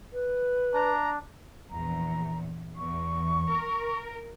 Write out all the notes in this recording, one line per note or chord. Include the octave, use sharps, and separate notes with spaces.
B4
D4 A#5
A#1 E2 A#5
E2 C#6
A#4